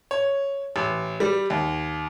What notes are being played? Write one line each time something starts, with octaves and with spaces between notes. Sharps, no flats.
C#5
A1
G3
D#2